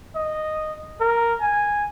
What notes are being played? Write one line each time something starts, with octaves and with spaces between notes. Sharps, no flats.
D#5
A#4
G#5